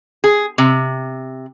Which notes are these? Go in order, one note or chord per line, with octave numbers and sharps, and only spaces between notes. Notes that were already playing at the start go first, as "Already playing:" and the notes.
G#4
C3